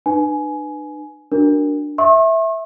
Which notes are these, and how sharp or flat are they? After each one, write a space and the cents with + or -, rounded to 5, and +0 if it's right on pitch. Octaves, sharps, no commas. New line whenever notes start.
D4 +45 B4 +0 G#5 +15
D4 +0 F#4 +0 A#4 +0
E5 -10 C#6 -45 E6 -35